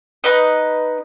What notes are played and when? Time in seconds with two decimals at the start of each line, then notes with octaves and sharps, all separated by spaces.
0.24 D#4 B4 D#5